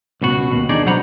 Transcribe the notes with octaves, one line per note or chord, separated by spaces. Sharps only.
C#2 B2 F#4
D#2 B2
D4 D#4 G#4 D5
B1 F#3 C5 F#5 A#5 B5